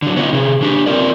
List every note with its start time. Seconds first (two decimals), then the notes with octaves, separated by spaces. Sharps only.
0.02 D3 F#3
0.16 B3 C#4 D#4 F4
0.33 C3 G#4
0.61 C#3 D4 G4
0.86 C4 C#4 F4 A#4 D5